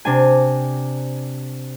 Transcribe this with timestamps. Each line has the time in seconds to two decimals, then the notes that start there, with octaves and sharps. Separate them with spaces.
0.05 C3 D4 G#5